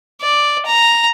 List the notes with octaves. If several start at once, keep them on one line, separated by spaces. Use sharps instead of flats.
D5
A#5